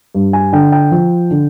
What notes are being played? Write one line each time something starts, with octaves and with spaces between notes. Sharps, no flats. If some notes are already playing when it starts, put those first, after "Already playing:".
G2
G#5
D3 G5
G5
F3
D3